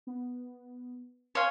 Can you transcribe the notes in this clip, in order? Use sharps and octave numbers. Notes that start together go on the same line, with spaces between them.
B3
C5 C#5 F5 G#5